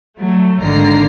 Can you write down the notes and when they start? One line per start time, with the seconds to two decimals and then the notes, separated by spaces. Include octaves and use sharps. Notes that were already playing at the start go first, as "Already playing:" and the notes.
0.19 F#3 A3
0.61 G#1 D3 D#3 A#3 A#5 C7